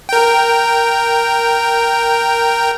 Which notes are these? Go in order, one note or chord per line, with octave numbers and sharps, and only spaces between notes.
A#4 G5